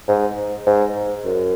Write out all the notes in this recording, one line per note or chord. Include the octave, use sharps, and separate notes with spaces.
G#2
G#2
F#2